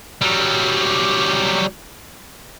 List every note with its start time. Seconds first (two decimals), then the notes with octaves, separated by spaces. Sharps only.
0.22 F#3 G3